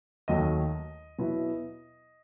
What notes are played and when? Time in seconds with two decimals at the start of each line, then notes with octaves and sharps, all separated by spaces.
0.28 D#2 D#3 F#3 A3 D#5
1.18 B2 F#3 B3 E4